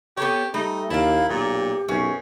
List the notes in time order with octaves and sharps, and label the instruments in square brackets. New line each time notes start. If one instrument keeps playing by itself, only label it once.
[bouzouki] B3 A4 C#5 [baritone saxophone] G4
[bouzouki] G3 [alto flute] A3 [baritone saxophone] D#4
[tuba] D#2 [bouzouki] A#3 A5 [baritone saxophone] E4 [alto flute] F5
[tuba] B1 [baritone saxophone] A#2 [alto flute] G4
[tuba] B1 [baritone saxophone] F#2 [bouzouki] C#4